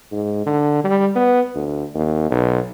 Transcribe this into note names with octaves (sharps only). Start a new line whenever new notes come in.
G#2
D3
G3
B3
D2
D#2
B1